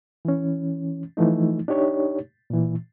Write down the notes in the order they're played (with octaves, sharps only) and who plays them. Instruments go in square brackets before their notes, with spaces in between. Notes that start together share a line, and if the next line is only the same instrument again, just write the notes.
[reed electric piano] E3 C#4
E3 F3 A3 D#4
D4 D#4 G4 C#5
A#2 E3